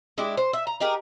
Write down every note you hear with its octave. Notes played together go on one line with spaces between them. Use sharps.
G#3 D4 E4 G4
C5
E5
A#5
D#4 G4 G#4 A#4